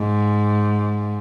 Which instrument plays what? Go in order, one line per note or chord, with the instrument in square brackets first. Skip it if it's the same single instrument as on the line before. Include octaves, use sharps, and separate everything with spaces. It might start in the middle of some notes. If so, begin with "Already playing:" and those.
Already playing: [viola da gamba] G#2